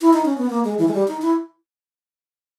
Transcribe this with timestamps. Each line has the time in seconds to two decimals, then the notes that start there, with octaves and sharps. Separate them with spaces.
0.01 E4
0.13 D#4
0.26 C#4
0.38 B3
0.50 A#3
0.65 G#3
0.79 E3
0.88 G#3
0.94 G3
1.08 D#4
1.22 E4